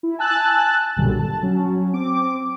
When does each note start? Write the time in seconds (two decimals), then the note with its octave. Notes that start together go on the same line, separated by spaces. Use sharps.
0.03 E4
0.18 G#5 A5 E6 F#6 A6
0.96 B1 G2 A#2 D3 F#3 G3
1.19 A5
1.43 F#3 C#4
1.94 C4 D6